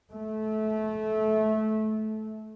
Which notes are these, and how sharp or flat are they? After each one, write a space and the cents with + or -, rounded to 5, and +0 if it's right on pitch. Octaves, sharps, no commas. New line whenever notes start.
A3 -20